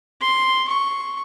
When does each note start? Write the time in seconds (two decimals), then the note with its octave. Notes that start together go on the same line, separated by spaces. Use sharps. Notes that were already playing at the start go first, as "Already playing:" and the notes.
0.21 C6
0.67 C#6